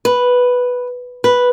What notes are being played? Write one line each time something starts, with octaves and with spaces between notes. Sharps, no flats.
B4
B4